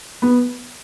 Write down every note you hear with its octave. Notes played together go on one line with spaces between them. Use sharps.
B3